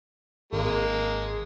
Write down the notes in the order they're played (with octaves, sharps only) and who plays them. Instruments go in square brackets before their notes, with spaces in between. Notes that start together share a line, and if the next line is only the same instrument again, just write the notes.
[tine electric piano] G#1 [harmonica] G#3 A#3